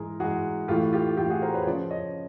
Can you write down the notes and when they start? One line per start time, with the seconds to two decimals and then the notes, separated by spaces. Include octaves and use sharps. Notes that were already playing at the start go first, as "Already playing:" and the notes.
Already playing: G#2 E3 G#4 A#4
0.20 G#2 E3 F#4 G#4
0.68 A2 F4 G4
0.71 E3
0.93 F4 G4
1.17 A2 E3 F4 G4
1.30 F#4 G#4
1.42 A#4 C5
1.54 B4 C#5
1.67 F#2 C#3 F3 C5 D5
1.91 C#5 D#5